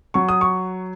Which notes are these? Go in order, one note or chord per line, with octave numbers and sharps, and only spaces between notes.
F#3 C#6
D#6
C#6